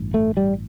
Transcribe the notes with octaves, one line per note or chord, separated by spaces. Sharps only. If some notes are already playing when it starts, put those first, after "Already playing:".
Already playing: A1 G2
A3
G3